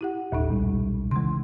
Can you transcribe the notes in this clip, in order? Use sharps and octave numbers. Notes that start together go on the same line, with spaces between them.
E4 G4 F#5
D#1 G#1 D#2 A#2 D#4
B1 G3 G#3
C#3 E3 G#3 C6